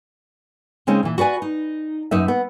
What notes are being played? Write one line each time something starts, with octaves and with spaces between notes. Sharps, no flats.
C#3 G#3 C4 C#4 D#4
A#2 E3
F#4 B4 D5 G#5
D#4
F#2 D#4 B4 E5
B3